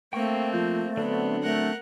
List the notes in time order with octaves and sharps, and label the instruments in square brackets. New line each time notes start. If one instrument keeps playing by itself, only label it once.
[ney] A3 [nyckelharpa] A#3 C4 [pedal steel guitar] G5 C#6
[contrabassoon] F3 [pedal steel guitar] G6
[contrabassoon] D3 [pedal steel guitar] F#3 C4 D4 [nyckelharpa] B3
[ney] A3 [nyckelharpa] A#4 F#5